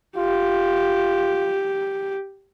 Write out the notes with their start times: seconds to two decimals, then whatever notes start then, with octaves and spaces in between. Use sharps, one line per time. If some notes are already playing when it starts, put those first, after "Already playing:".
0.17 F4 G4